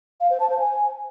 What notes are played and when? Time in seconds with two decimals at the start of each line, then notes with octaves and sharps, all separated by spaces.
0.20 F5
0.30 C5
0.40 A5
0.49 C5
0.59 G#5